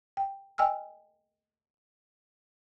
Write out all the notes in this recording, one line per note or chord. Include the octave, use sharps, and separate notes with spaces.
G5
D#5 G5 G#5 E6 F6